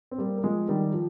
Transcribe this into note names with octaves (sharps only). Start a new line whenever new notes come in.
C4
G3 A#3
A#3
F3 G#3
D#3 G3
F3